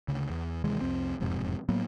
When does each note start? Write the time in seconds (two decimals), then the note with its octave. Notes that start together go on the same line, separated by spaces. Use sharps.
0.08 D2 C#3
0.30 E2
0.64 D#2 C3 E3 G#3
0.81 C2 F2 C4
1.20 E1 F2 G#2 C3
1.69 A2 F#3 A#3 B3